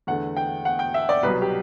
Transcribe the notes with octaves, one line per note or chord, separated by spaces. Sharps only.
E2 D3 A3 F#5
G5
F#5
G5
E5
D5
C2 B2 F#3 B4
G4